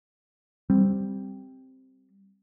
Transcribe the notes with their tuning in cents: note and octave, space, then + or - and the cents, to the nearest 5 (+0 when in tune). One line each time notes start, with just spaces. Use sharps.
G3 +0 C4 +0